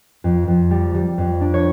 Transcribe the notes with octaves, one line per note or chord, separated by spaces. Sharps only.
F2
F2
G3
G3
F2
D4
C#5